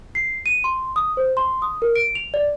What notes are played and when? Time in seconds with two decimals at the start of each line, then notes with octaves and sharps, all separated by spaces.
0.15 C7
0.46 D#7
0.64 C6
0.96 D#6
1.17 C5
1.37 C6
1.62 D#6
1.82 A#4
1.96 D7
2.15 F7
2.34 D5